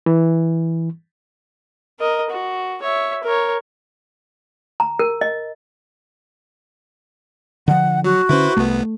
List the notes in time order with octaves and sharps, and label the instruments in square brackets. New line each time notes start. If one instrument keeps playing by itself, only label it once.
[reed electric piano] E3
[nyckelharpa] A#4 D#5
F#4
C#5 E5
A#4 C#5
[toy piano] A#5
A#4
D#5
[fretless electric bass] D3 F3 [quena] F#5
[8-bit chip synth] F#3 [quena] F#4
[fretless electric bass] D3 C#4 [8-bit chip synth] E4 B4 C5
[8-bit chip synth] C2 B3 [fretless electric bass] A3